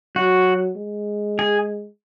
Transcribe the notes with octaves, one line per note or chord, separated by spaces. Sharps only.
F#3 F#4
G#3
G#4